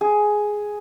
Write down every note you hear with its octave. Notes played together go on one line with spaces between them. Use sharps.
G#4